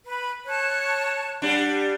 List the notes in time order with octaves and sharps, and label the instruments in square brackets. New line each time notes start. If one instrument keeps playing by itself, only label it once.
[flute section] B4 B5
C#5 A5 F#6
[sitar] G3 D4 [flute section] F#5